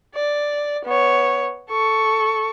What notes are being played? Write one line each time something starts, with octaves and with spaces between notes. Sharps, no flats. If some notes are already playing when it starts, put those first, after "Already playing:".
D5
B3 C#5
A4 C#6